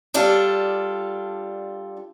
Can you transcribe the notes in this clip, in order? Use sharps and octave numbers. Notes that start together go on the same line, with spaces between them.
G3 D4 F4 A4